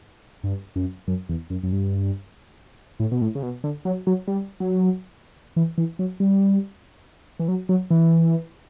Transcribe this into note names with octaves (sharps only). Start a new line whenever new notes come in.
G2
F#2
F#2
E2
F#2
F#2
G2
A2
B2
A2
C#3
B2
D3
F#3
F#3
G3
F#3
E3
E3
F#3
G3
E3
F#3
F#3
E3